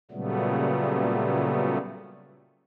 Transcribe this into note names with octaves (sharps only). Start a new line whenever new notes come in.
A#2 C#3 F#3 G3 A3 B3